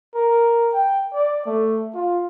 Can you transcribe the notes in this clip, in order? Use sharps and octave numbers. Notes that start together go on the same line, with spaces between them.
A#4
G5
D5
A3
F4